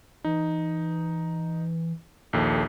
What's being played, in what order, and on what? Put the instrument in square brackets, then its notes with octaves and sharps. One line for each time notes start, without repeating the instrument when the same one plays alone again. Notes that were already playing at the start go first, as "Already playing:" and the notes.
[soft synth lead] E3 [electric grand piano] D#4
[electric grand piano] A#1 D#2 [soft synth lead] A4